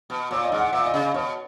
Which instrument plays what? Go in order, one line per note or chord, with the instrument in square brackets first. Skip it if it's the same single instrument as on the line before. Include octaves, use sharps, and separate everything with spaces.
[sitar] B2
[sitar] A#2 [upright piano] C#5
[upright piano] D#5
[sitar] G#2
[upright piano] F#5
[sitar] A#2 [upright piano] E5
[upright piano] D#5
[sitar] C#3
[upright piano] D#5
[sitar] B2 [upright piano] C#5